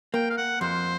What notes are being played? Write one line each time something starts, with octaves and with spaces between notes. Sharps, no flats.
A#3 G5
F5
F#5
F2 C5